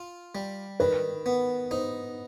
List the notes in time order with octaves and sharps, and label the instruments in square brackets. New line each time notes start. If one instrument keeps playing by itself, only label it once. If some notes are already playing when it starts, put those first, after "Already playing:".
Already playing: [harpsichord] F4
G3
[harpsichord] D#3 [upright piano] B4
[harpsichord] B3
[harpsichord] D#4 [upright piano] C5